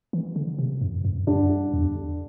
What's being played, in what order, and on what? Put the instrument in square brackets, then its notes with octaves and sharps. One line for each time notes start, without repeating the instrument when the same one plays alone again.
[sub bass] E3
D3
C3
F#2
F#2
[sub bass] F#2 [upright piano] D3 G3 D4
[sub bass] E2